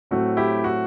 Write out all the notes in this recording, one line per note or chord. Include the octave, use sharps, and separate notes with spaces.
A2 F#3 A3 C4 F#4
E4 G4
F#4